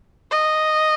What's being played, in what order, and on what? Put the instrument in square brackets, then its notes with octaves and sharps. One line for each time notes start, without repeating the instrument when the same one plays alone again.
[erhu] D#5